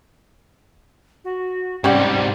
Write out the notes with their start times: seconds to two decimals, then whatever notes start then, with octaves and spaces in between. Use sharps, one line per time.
1.25 F#4
1.84 G#2 C3 G3 C#4 G4 D5 F#5